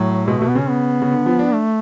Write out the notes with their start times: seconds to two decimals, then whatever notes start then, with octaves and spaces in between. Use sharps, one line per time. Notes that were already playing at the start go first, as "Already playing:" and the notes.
Already playing: A2 F#3
0.28 B2 G#3
0.38 B2 A3
0.49 B3
0.55 C#3 C#4
0.69 B3
1.02 C#3
1.12 D3
1.26 F3
1.39 D4
1.53 A3